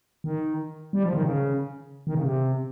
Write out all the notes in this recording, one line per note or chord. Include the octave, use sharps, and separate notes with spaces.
D#3
G3
F3
D#3
C#3
D#3
C#3
C3